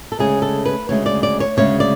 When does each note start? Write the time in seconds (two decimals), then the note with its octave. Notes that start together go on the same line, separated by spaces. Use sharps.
0.12 A4
0.19 D2 C#3 G#3 G#4
0.42 A4
0.65 B4
0.89 D2 C#3 G#3 C#5
1.06 D5
1.23 D5
1.40 C#5
1.57 D2 C#3 G#3 C#5
1.80 D5